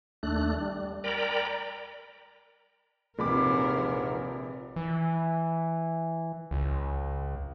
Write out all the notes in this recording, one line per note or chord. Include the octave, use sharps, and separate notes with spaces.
D#2 A3 D4 F#6
G3
A#4 D5 G5 A#5 B5
A#1 D#2 G#2 C3 E3 A#4 B5 D6
E3
C#2